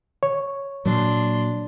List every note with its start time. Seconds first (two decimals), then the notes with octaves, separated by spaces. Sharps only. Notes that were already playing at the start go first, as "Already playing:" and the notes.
0.23 C#5
0.86 A#2 F#3 D4 C6